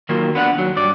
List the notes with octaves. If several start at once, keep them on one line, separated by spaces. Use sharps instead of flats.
D#3 F#3 A#3 F4
B3 D4 F5 F#5
D#2 F#3
G2 D5